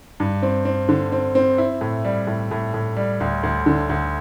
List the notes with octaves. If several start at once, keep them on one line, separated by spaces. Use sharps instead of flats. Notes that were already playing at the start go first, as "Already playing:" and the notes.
G2
C4
C4
D3
C4
C4
E4
A2
G3
A2
A2
A2
G3
D2
D2
D3
D2